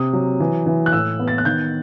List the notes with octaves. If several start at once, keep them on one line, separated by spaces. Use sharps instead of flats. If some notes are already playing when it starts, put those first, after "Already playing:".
Already playing: C3 D#6
F#3
E3
E3
F#6
A2 E6
B3
A6
F#6
D#3 G6